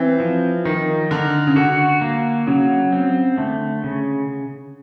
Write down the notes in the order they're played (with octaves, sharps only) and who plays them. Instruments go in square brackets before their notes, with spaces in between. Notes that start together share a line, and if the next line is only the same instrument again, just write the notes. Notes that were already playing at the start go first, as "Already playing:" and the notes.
Already playing: [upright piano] E3 [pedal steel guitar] C4
[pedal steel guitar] F3
[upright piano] D#3 [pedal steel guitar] D#4
[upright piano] D3 [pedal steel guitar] A#4
[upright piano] C#3
[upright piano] D3 [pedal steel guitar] F#4
[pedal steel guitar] A#3
[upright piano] C#3 [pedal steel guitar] F#3
[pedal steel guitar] C4
[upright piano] D3 [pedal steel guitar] A3
[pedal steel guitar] C#3